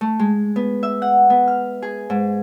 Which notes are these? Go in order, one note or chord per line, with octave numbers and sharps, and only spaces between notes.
A3
G#3
B3
E5
F#5
B3
F6
G#4
G#2